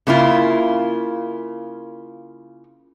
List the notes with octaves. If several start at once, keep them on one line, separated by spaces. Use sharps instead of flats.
C#3 A#3 E4 F4